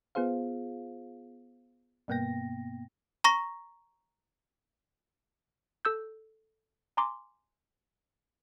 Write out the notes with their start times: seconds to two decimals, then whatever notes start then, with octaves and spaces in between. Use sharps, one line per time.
0.15 B3 F4 G#4 C5 F5
2.08 G2 B2 A#3 B3 G5 A#6
3.24 A#5 C#6 A#6
5.85 A4 E6 G6
6.97 G#5 A#5 C6 D6